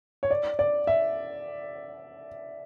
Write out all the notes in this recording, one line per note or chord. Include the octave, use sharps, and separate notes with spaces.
C#5
D5
D5
E5